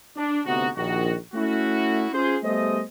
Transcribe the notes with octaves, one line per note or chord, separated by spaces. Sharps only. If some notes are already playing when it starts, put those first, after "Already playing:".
D4
D2 C3 B3 D#4 F#4
A#1 D#3 F#4
A3 C#4 E4 F#4
C#4 F4 G#4 C5
G3 A3 B3 G#4 C5 D#5